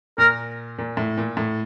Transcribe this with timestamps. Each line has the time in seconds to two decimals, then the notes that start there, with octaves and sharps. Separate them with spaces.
0.18 A#2 A#4
0.79 A#2
0.97 A2
1.18 A#2
1.37 A2